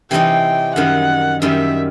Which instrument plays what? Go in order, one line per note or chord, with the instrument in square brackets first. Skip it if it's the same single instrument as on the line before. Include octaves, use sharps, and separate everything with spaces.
[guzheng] C3 E3 G3 C4 D#4 [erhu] G5
[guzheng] F#2 D#3 G3 [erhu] F#5
[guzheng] F#2 D#3 G3 [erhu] E5